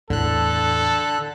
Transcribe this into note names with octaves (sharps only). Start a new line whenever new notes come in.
E2 A2 D3 A4 F#6